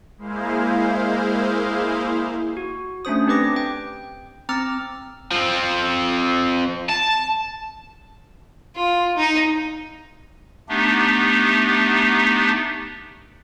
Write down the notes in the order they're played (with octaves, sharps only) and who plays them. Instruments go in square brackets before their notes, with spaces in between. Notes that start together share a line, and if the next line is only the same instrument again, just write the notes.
[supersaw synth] G#3 A#3 E4 G#4 C5 F5
[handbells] F#4
A3 C#4 D4 C5 D#6
C4 D4 G4 B4 D6 A#6
G5
C4 A#5 D6 E6 F6 A6
[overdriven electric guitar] F3 C4
A5
[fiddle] F4
D#4
[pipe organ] A3 B3 D4 D#4 G4